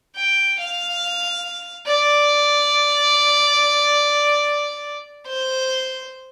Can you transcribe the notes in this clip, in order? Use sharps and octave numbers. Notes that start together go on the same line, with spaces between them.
G5
F5
D5
C5